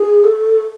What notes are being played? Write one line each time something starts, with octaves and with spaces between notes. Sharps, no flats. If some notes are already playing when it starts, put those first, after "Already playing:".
Already playing: G#4
A4